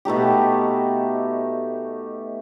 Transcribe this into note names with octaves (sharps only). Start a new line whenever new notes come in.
B2 A3 D#4 G4